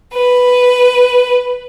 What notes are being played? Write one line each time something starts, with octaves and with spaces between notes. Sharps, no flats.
B4